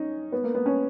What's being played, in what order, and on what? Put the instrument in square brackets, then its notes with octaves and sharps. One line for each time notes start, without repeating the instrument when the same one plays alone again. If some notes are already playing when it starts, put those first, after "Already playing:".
Already playing: [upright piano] C#4 D#4
B3
A#3
B3
C#4